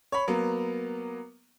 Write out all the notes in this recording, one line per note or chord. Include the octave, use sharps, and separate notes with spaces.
C#5 B5
F#3 A#3 B3